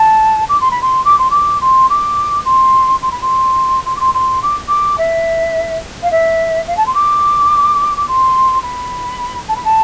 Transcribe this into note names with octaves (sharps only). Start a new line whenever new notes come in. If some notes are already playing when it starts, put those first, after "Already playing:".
Already playing: A5
D6
C6
B5
C6
D6
C6
D6
C6
D6
C6
C6
B5
C6
C6
D6
C6
C6
D6
D6
E5
F5
E5
F5
A5
C6
D6
D6
C6
B5
A5
B5
A5